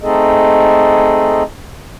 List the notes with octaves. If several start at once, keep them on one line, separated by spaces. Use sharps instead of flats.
A3 C4 D#4 G#4 A4 D#5